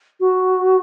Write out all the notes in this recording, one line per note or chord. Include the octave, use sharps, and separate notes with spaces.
F#4